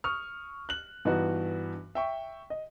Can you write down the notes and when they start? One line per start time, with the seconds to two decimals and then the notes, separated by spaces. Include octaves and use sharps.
0.04 C#6 D#6 F6
0.69 F#6 F#7
1.05 G2 E3 B3 D#4 F#4
1.95 E5 G5 C#6
2.50 D#5